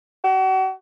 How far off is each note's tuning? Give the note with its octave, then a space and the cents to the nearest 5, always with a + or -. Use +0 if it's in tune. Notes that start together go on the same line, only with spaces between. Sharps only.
F#4 +40